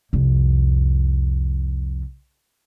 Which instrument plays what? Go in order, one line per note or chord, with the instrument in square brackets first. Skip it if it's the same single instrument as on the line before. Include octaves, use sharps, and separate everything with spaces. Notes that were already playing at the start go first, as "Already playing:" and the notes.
[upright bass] C2 F2